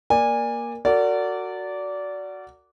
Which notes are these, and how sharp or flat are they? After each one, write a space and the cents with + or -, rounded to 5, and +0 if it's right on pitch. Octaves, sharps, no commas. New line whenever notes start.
A#3 +15 D5 +5 G#5 -20
F#4 +0 A#4 -40 D5 -20